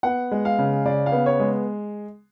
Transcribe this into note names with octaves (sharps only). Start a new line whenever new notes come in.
B3 F#5
G#3
F5
C#3
C#3 D5
F5
B3
C#5
G#3